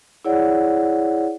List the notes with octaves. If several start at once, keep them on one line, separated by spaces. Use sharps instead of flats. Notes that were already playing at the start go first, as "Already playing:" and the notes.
E4 G#4 C#5 D5 F#5